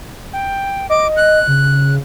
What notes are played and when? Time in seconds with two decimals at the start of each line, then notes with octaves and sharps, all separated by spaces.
0.33 G5
0.89 D#5 D6
1.17 F#6
1.47 C#3